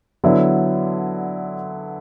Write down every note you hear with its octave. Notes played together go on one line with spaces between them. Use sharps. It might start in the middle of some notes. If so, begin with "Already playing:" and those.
D3 F#3 B3 E4